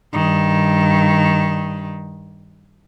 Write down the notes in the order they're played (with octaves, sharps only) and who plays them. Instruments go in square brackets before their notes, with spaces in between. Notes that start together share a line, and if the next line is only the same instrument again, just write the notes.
[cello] G2 D#3